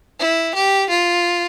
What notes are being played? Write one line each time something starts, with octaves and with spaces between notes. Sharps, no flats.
E4
G4
F4